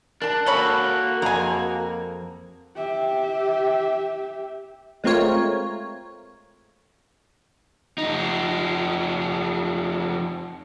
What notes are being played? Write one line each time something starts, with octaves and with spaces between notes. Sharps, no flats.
D4 A#4 A5
A#3 C#4 F#4 A4 C#5 B5
F2 G#3 G#5 A#5
G4 E5
G#3 A3 C4 F4 A#4 C#5
F2 D#4